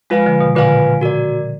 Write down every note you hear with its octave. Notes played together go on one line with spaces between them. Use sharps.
F3 G#3 F4 B4 F5 G#5
D3 F3
B2 D#3
A#2 D3 F4 B4 F5 G#5
F#4 A#4 D5